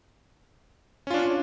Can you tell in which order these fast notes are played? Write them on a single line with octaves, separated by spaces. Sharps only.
C#4 F4 D4